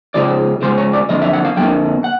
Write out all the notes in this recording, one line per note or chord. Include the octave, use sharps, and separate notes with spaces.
C#2 C#3 F3 G#3 D5
C#2 C#3 F3 G#3 C5
C#5
D5
F2 D3 F3 A#3 D#5
E5
F#5
F5
F2 D3 F3 A#3 G5
F#5